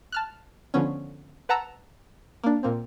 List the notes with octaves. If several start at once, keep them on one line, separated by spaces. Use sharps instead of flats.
A5 F6 F#6
D3 F3 B3 C#4
B4 F#5 A5 A#5 E6
A#3 D4
A#2 A#3 C4